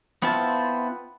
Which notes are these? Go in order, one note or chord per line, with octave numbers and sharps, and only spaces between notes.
B3 C4 E4 F4 A5